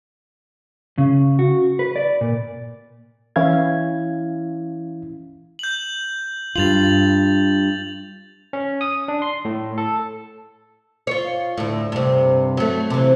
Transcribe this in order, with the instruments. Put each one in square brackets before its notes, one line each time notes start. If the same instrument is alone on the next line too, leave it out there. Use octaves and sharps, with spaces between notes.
[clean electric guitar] C#3
F#4
B4
D5
A#2
[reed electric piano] E3 C#4 E4 F5 G#6
[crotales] G6 F#7
[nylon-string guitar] G2 F4 [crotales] A6 F7 F#7
[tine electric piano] C#4
D#6
D4
C6
A2
A4
[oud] F4 C#5
D2 A2
G2 C3
F#3 A3
C3 E3